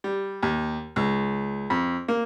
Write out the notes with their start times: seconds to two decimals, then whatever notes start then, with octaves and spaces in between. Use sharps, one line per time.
0.04 G3
0.43 D#2
0.96 C#2
1.70 F2
2.08 A#3